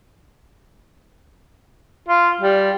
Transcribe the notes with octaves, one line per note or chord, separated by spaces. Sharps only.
F4
G3